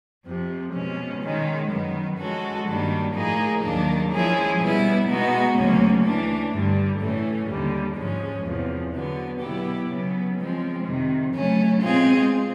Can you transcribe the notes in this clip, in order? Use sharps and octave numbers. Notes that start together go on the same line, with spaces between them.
F2 C3 F3
B2 G#3 C#4
D#3 G#3 C#4
F#2 D#3 F#3 B3
F3 G#3 C#4 F#4 A4
G2 D#3 G3 A#3 D4
A2 F3 A#3 D#4 G#4
D#2 D#3 F#3 A#3 D4
F3 G#3 C#4 E4 G#4
B2 G3 B3 E4
B2 G#3 B3 D#4 F#4
D2 C#3 F#3 A#3 C#4
E3 A3 D4
G2 D3 G3
A2 E3 A3 C#4
D#2 D3 G3
G#2 F3 G#3 C#4
E2 C3 F3
D3 F#3 B3
B2 F#3 B3 E4 G4
C#3 F#3 B3
F3 G#3 C4
F2 C3 D#3
C#3 F#3 A3 C#4
B2 G#3 C4 F4 G#4